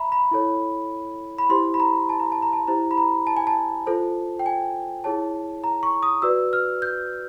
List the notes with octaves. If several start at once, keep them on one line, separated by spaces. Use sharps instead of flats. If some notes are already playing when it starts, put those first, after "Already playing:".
Already playing: E5 A#5 B5
B5
E4 A4 C#5
B5
E4 G4 C5 C6
B5
A#5
A5
A#5
A5
A#5
A5
E4 G4 C5 A#5
B5
A#5
A5
G#5
A5
F4 A4 C5
G5
G#5
E4 G#4 C#5 A5
A#5
C#6
D#6
F#4 B4 D5 E6
F6
G6